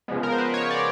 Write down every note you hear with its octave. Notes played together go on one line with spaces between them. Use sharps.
C#3 F3 G#3 B3
A#4
C5
B4
C#5
D5